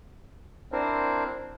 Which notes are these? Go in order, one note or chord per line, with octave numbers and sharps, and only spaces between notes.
C4 D4 E4 A#4 C5